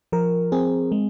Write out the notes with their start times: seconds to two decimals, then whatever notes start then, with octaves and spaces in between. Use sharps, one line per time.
0.12 F3 A#4
0.52 C4 G#4
0.92 G#3